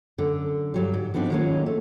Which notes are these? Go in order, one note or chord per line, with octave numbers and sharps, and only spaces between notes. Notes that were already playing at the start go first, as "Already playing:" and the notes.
F#2 D3
G2 F#3 G3
G#2
F3 B3 C4 D4 D#4
D#3 F#3 G#3 A#3 C#4 F4
A3